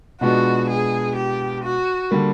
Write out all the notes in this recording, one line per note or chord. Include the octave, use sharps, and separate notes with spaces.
B2 G#3 B3 D4 F4 F#4
G#4
G4
F#4
D3 G3 A#3